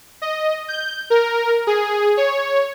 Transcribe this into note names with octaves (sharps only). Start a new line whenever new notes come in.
D#5
G6
A#4
G#4
C#5